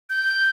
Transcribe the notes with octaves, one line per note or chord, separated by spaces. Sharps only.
G6